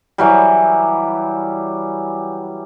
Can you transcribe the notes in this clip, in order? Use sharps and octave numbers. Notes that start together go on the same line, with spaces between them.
E3 F#3 G3